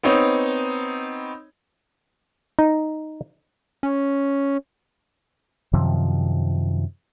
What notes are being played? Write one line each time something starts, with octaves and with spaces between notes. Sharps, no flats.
B3 C4 D#4 C#5
D#4
C#4
F#2 C3 D#3 F3